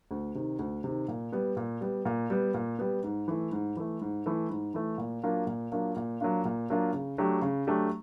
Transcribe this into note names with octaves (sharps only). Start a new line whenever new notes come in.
D2
C3 D#3
D2
C3 D#3
A#2
G3 B3
A#2
G3 B3
A#2
G3 B3
A#2
G3 B3
G#2
E3 A3
G#2
E3 A3
G#2
E3 A3
G#2
E3 A3
A#2
F#3 A#3 D4 F4
A#2
F#3 A#3 D4 F4
A#2
F#3 A#3 D4 F4
A#2
F#3 A#3 D4 F4
C#3
F#3 A3 D4 G4
C#3
F#3 A3 D4 G4